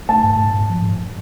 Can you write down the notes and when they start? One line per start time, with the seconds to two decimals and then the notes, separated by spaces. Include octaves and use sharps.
0.09 A3 A5
0.23 G#2
0.39 G#2
0.54 G#2
0.70 F3
0.84 G#2